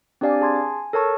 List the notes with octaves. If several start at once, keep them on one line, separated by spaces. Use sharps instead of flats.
C4 D4 G4 D5 F5 G#5
G#4 A5 C6 G#6
G#5
A4 A#4 C#5 A5 C#6